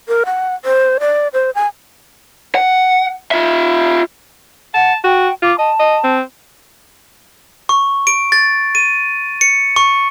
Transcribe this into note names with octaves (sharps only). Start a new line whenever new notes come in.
A#4
F#5
C5
D5
C5
G#5
F#5
F4 E5
F#5 A5
F#4 G5
F4 D6
D#5 A5
D#5
C4
C#6
D7
A6
D#7
C#7
C#6